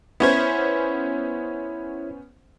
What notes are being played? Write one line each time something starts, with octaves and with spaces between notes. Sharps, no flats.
B3 C#4 E4 C5 C#5 G#6